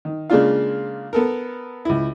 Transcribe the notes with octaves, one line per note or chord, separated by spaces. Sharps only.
D#3
C#3 G#3 A#3 D4 F4 F5
B3 A4 A#4
C#2 E4